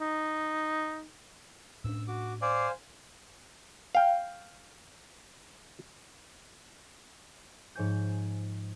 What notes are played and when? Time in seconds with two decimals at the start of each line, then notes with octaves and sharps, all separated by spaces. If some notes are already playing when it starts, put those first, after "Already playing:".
0.01 D#4
1.84 A2 C#4 D4 E6
2.08 F#4 D6
2.42 C5 D5 F5 G#5
3.95 F5 G5
7.75 G#2 F3 C#5 G#5 G6